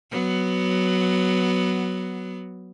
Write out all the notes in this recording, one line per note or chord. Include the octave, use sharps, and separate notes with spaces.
F#3 B3